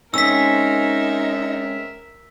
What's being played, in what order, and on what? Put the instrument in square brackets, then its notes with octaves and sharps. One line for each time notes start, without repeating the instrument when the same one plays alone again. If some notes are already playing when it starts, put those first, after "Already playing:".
[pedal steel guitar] G#3 C4 C#4 [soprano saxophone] D#4 [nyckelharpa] A#4 E5 [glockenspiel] E6 B6